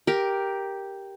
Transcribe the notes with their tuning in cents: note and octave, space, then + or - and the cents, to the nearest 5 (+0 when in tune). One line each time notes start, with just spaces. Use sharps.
G4 +0 A#4 +5